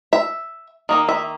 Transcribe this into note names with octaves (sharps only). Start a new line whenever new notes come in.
E5
D#3 A#3 D#4
E5